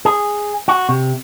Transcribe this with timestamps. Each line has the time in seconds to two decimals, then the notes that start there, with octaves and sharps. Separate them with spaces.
0.05 G#4
0.68 F#4
0.89 C3